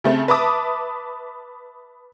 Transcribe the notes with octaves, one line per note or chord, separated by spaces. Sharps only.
C#3 A3 C4
B4 E5 A5 D6 D#6